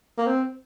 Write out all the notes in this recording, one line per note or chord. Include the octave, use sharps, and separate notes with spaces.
A#3
C4